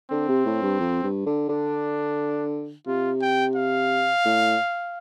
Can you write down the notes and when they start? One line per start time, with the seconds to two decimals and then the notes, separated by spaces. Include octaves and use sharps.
0.11 D3 C4
0.29 C3
0.46 A2
0.62 G2
0.80 F2
1.03 G2
1.26 D3
1.49 D3 D4
2.87 C3 F4
3.21 G5
3.56 F5
4.25 A2